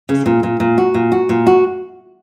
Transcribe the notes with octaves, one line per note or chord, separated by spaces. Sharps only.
C#3
A#2
A#2
A#2
F#4
A#2
F#4
A#2
F#4